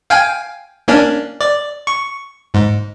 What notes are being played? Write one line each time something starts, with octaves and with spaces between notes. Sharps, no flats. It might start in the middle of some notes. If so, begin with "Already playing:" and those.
F5 G5 G#5
A#3 C#4 D4
D5
C#6
G#2